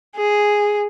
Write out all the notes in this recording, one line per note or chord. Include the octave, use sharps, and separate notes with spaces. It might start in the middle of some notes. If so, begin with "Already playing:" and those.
G#4